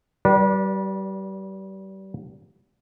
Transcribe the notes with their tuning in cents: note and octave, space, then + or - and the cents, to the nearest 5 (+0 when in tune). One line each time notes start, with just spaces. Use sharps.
G3 -30 B4 -30 D5 +5